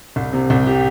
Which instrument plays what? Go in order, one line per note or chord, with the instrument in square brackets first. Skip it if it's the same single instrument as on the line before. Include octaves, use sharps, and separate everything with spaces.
[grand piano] C2
C3
C2
G4